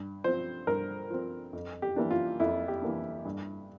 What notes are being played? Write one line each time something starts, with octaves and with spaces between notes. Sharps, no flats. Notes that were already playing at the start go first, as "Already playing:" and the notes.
Already playing: G2
F3 C4 C5
G2 A#4
F3 C4
F2
G4
E3 A#3 D4
F4
F2 E4
G4
E3 A#3 D4
G2